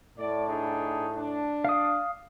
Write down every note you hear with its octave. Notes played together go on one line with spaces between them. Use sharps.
A2 D5
D4 D#4 G#4
D4
F5 D#6